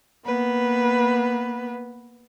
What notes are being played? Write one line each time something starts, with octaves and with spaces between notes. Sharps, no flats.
A#3 B3 B4